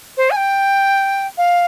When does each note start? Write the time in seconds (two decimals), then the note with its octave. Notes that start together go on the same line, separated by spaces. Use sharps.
0.17 C5
0.31 G#5
0.36 G5
1.37 F5